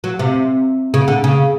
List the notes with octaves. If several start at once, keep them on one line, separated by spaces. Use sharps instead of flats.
F#3
C3
C#3
D3
C#3